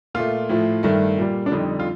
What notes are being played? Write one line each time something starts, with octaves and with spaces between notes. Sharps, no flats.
A#2 A3 F4
A2 F3 A3
G2 D#3 A3
A#2 G3
D4
F2 D3 G3 D#4
F4